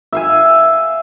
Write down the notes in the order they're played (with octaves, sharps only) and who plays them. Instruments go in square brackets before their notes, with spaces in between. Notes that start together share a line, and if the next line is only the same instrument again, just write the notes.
[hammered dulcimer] E5 F5 G#5